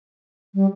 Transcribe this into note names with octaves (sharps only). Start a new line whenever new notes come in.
G3